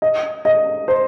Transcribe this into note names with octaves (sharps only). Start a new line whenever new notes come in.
D#5
D#5
C5